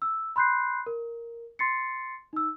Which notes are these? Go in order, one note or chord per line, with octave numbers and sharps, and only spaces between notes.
E6
B5 C6 F#6 G6 C7
A#4
C6 A6 C7 C#7
D#4 E6